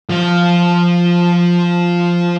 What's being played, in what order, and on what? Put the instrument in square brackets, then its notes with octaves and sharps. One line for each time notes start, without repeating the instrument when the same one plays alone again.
[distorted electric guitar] F3 F5